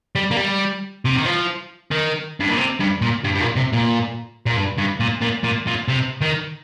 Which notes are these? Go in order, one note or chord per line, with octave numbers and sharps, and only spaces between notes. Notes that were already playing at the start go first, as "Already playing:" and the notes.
G3
A#3
G3
C3
D#3
F3
D#3
G2
A#2
C3
G2
A#2
G2
G2
A#2
C3
A#2
A#2
G2
G2
A#2
A#2
A#2
A#2
C3
D#3